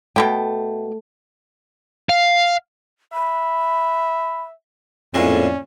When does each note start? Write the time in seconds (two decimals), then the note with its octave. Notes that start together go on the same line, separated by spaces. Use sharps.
0.16 B2 A3 E4 G5
2.09 F5
3.13 E5 B5
5.14 A#1 F2 A2 G#3 C#4 D5